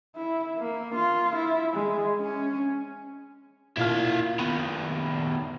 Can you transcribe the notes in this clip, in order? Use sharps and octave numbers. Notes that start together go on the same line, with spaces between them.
E4
A#3
F4
E4
G#3
C#4
A#2 E4 F5 F6
D#3 B3